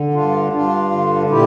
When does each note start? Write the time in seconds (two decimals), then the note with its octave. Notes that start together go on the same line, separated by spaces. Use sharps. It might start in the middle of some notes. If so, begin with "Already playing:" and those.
Already playing: D3
0.14 G2 D4 F4
0.53 G2 D4 F4
0.91 D3
1.30 A#2 E4 G4